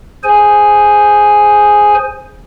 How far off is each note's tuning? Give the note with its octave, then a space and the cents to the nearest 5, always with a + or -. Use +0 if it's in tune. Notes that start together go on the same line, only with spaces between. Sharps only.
G#4 +0 C5 +0 G#5 +0